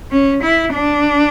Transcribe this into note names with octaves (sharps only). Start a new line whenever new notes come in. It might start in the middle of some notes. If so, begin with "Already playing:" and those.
C#4
E4
D4